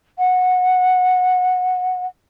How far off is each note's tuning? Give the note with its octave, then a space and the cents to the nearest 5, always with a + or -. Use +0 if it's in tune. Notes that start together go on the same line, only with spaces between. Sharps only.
F#5 -15